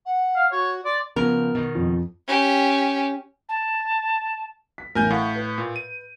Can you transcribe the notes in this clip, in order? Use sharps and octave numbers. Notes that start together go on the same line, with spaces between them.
F#5
F5
F#4 C#5
D5 C6
C#3 F3 B3 A#4
B2 D#3
F2
C#4 G4
A5
B6
A1 A2 A#4 G#5 G6
A2 F5 F#5 C#6
B4
A#2
D#7